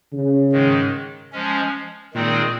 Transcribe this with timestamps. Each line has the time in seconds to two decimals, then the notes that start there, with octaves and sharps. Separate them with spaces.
0.13 C#3
0.52 G#2 D#3 G#3
1.32 F3 G#3 C#4
2.14 A#2 D#3 G#3 C4 D#4 G#4